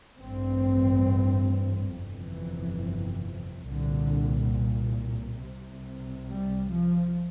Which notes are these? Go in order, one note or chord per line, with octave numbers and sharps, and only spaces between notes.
A1 G2 C4
G1 F2 C3 E3
C2 A#2 D3
C2 C3
G3
F3